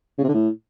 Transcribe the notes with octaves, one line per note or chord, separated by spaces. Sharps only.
C#3
C3
D3
A2